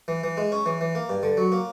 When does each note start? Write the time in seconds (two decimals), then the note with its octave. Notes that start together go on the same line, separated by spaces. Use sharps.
0.08 E3
0.24 E3
0.37 G#3
0.52 C#4
0.66 E3
0.81 E3
0.95 A#3
1.09 G2
1.23 D3
1.37 F#3
1.52 A#3